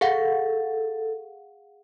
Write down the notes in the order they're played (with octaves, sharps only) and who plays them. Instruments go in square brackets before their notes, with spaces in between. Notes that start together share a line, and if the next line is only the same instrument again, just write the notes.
[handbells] G#4 F5 F#5 [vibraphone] A4